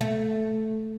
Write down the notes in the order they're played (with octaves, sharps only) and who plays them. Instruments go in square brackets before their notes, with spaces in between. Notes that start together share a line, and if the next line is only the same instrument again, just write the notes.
[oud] A3